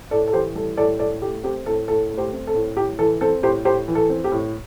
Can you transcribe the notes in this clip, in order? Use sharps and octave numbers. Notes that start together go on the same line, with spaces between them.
A2 A4 D5
A4
E3 G4 C5
G3 A4
A2 A4 D5
A2 A4 D5
A3 G4
C4 G4 C5
A2 A4
A2 A4
A3
G4 C5
C4
A4
A2
A2 G4
E3 A4
C4 A4
A2 G4 C5
A2 G4 C5
E3
A4
C4
G4
A2